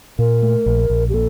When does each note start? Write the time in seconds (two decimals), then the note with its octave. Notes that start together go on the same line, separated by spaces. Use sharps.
0.19 A#2 A#4
0.42 A3
0.66 A#1
0.90 A#1
1.09 G4
1.13 A#2 A4